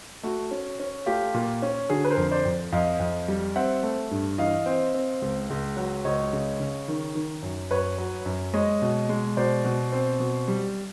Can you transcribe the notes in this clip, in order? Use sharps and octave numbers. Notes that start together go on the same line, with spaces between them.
A3 F#4
C#4
C#4
A3 F4 G4
A#2
C#4
D3 F#4 G#4
B4
A#4 C5
F2
C5 D5
F2
F2 D#5 F5
F2
G3
C4 E5 F#5
A3
G2
E3 D#5 F5
C4
C4
C#2
C#2
F#3
C#2 C#5 D#5
C#3
C#3
D#3
D#3
F#2
F#2 B4 C#5
F#3
F#2
G#3 C#5 D#5
B2
G#3
B2 C5 D5
B2
C4
B2
G3